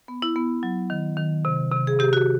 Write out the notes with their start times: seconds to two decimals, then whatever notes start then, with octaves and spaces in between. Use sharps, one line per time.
0.08 B3
0.22 E4
0.36 B3
0.63 F#3
0.90 D#3
1.17 D#3
1.45 C3
1.72 C3
1.87 G#4
1.99 C3 G4
2.13 F#4